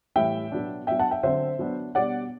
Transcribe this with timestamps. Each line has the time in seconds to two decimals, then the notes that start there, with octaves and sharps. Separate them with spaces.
0.16 A2 E3 G3 E5 G5
0.52 B2 F#3 B3 D4
0.87 F#3 B3 D4 E5 G5
0.99 F#5 A5
1.11 E5 G5
1.23 D3 F#3 C4 C5 E5
1.59 F#3 B3 D4
1.95 B2 G3 D4 D5 F#5